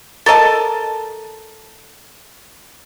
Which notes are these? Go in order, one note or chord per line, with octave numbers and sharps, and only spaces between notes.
A4 A#4 D#5 A5